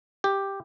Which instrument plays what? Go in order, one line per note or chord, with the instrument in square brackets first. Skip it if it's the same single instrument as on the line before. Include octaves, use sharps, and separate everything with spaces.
[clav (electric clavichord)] G4